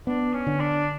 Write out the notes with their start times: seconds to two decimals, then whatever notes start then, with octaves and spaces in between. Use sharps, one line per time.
0.07 B3 D4
0.33 C#4
0.47 D3
0.60 D4